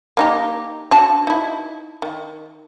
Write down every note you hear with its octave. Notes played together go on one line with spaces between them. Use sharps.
A#3 D#4 G4
D4 F#4 A5
D#4 E4
D#3